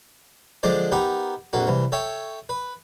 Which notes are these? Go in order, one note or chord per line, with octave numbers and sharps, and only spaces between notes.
D3 F3 G#3 D4 C5 D5
B3 D#4 G4 A#4
A#1 F2 A#3 F#4
C2 E3
A4 C#5 E5 G5
B4